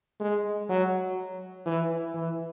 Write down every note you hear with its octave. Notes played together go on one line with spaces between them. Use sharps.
G#3
F#3
E3
E3